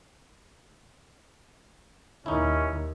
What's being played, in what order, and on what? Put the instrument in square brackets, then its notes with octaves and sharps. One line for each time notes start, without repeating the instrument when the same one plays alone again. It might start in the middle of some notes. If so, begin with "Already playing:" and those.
[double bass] D#2 [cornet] C#4 [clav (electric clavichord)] D#4 E4